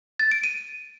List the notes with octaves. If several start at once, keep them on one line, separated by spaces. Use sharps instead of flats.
A6
D7
D#7